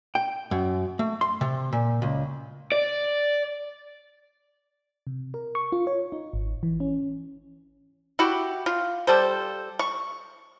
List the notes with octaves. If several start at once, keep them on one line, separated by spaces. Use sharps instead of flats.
G5
F#2
A3
C6
C3
A#2
C#2
D5
C3
A#4
C#6
F4
C#5
D#4
G#1
E3
C#4
E4 F#4 G4
F4
G3 A4 C5
C#6